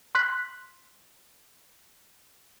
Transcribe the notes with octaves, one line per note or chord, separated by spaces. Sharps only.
C6 F#6 B6